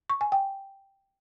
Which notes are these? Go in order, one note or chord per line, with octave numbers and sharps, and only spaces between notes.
C#6
G#5
G5